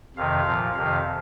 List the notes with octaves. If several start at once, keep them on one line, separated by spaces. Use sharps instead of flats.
F2 C3 D#3 F5
A#2 F3
F2 C3 D#3 F5